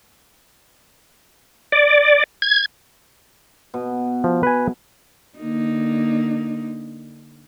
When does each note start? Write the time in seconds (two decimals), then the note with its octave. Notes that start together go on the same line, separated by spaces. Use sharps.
1.72 D5
2.42 G#6
3.74 B2
4.24 F3
4.43 B4 G#5
5.39 D3 A#3 D#4